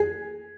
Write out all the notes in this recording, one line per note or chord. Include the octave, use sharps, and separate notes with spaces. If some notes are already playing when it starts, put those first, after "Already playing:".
Already playing: G#4